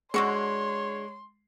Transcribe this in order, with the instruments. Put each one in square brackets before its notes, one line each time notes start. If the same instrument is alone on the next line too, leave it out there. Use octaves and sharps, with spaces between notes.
[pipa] D3 F#4 C#6 [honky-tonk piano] G#3 [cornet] C#5 [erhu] C6